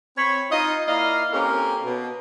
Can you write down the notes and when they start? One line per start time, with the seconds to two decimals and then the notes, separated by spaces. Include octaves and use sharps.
0.17 C4 C#5 B5
0.51 D#4 F4 D#5
0.88 A#3 E4 D5 D#5 F5
1.33 A#3 C4 C#4 G4 A4 A#4
1.83 B2